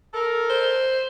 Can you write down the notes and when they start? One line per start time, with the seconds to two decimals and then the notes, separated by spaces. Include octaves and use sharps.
0.14 A4 A#4
0.50 C5